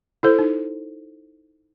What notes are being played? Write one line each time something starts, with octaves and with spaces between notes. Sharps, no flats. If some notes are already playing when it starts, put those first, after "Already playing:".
E4 A4 C5
D#4